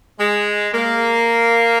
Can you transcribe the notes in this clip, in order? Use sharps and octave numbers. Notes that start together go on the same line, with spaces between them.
G#3
A#3